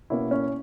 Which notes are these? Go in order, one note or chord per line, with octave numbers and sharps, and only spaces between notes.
B2 A#3 C#4 E4
C#4